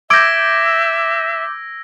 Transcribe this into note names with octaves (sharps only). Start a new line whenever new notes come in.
E5 D6 E6 G6 G#6 A#6 D7